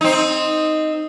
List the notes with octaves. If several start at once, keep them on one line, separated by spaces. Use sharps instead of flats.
C4 D#4